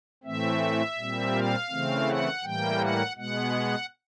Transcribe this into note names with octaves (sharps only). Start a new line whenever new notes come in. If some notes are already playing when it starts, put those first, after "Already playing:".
A2 E3 A3 C4 E5
A#2 G3 C4
F5
C#3 E3 A3 C4
F#5
A2 E3 G3 A#3 G5
F#5
B2 G#3 B3 F#5